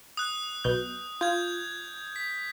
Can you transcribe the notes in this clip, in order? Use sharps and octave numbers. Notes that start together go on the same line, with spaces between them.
D#6 F#6
B1 B2 G6
F4 G6 G#6
B6